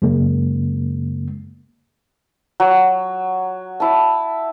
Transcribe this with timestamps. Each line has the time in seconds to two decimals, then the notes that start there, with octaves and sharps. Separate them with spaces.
0.02 F#2 C#3 G#3 A#3
2.60 F#3
3.80 E4 A5